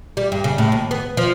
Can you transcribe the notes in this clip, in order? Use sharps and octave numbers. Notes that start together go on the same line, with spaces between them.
G3
G2
C#3
A2
D#2
B3
F3